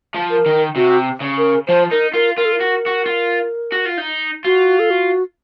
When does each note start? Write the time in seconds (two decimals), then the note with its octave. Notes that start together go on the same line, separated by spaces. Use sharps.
0.15 F3
0.30 A#4
0.46 D#3
0.76 C3 F#4
1.21 C#3
1.38 A#4
1.67 F3 C5
1.91 D#4 A#4
2.14 F4 A#4
2.37 F4 A#4
2.45 A4
2.52 A#4
2.61 F#4
2.86 F#4
3.06 F4
3.72 F#4
3.85 F4
3.98 D#4
4.44 F4 F#4
4.79 A4
4.90 F#4